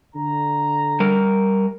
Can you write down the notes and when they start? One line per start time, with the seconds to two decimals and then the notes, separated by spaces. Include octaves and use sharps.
0.15 D3 A#5
1.00 G3 A#4